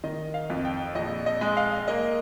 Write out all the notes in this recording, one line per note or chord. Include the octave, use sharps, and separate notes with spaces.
D#3 D#5
F5
F2
G5
A#1 D#5
D#5
G#3
F5
A#3 D#5